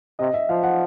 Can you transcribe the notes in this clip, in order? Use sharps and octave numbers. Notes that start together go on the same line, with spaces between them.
C3 D#5
E5
F3 F5
F#5